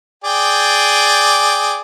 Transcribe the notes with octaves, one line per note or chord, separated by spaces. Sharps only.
G#4 D5 G5